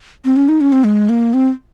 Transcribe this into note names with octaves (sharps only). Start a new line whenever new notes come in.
C4
C#4
D#4
C#4
C4
G#3
A#3
C4